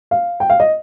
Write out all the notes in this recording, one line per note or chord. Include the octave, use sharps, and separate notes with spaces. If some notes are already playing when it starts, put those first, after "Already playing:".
F5
G5
F5
D#5